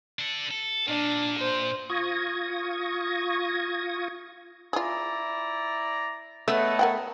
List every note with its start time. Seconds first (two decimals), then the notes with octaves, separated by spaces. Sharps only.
0.19 D4 A4
0.51 A4
0.88 A#2 D4
1.40 C5
1.90 F4 C#6 D#6 G#6 A#6
4.73 E4 F4 G#4 D5 A#5
6.48 A3 B3 A4 C#5 D#5 E5
6.79 A#4 F#5 G5